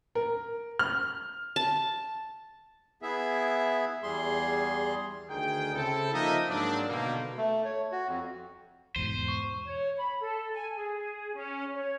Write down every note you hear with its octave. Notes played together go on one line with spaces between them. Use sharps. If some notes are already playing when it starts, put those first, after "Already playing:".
A#4
F6
A5
B3 E4 G#4 E5
E2 G3 G#4 C6
D2 D#3 G#4 G5
C#3 C4 E4 A4
F3 A#3 D#4 A#4 D#5 E5
G#2 F#3 A#3 C4 D4
B2 D3 D#3 G3 A#3
A3
C#5
F#4
F2
E2 G#2 B2 C5 D#7
C#6
C#5
B5
A4
G#5
G#4
C#4
C#5